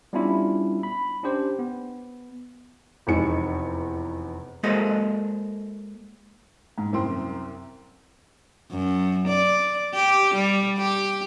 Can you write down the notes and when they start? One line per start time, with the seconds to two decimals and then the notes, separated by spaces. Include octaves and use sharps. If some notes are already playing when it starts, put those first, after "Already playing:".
0.13 G3 B3 C#4 D4 E4 F4
0.83 B5
1.23 C#4 D4 G4 C5
1.59 B3
3.07 F1 E2 G#3 D#4 G#5 C#7
4.63 G#3 A#3 F#4 A4 C5 D#5
6.78 G#2
6.93 C2 F#2 C4 C6
8.71 F#2
9.27 D5
9.94 G4
10.34 G3
10.78 G4